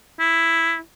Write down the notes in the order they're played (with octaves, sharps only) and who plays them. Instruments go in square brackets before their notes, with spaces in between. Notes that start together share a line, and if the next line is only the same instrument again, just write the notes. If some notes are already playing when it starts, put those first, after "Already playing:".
[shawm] E4